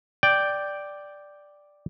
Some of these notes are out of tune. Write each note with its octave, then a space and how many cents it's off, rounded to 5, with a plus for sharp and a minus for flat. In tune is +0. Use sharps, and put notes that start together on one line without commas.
D5 +0 G5 +0